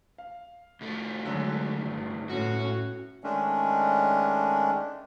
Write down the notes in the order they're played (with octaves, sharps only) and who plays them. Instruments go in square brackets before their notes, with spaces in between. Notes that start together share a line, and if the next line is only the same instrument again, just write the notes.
[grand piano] F5
[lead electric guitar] C2 A3
[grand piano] D3 F#3 G#3
G1
[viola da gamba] A2 C#4 [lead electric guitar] F#4
[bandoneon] D#3 G#3 A3 C#4 D4